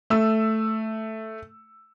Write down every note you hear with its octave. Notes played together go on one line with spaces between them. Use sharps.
A3 E6